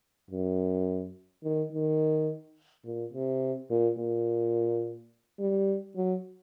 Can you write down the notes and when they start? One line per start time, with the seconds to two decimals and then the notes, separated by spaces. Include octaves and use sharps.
0.31 F#2
1.44 D#3
1.72 D#3
2.85 A#2
3.13 C3
3.70 A#2
3.98 A#2
5.40 G3
5.96 F#3